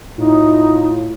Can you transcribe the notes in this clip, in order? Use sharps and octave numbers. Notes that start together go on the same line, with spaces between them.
A2 D#4 F4